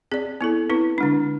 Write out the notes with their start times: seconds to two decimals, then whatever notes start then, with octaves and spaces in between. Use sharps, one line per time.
0.12 C4 G#4 D5
0.41 B3 E4 A4
0.70 C4 E4 B4
0.98 D3 G#3 D4